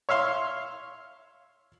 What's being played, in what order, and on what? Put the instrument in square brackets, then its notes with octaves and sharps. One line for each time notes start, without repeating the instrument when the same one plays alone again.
[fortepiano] C#5 E5 F5 C6